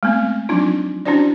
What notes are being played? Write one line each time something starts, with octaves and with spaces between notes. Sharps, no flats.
G#3 A3 B3 C4
F3 F#3 C4 D4 D#4 F4
C#4 D4 E4 F#4 C5 D5